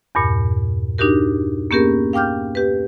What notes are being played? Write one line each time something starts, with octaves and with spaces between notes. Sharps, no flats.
E2 G2 A#2
D4 D#4 F#4 G4 A#4
A#3 B3 C#4 G4 G#4 A#4
F5 G5 D6 F6 G6
G4 B4